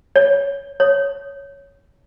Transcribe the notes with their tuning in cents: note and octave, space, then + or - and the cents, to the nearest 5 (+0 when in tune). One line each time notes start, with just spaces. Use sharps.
C#5 +15
C#5 +5